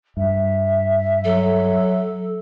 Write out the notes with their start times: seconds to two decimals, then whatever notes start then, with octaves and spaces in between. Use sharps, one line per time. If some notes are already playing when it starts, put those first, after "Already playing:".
0.17 G2 E5
1.25 F#3 A4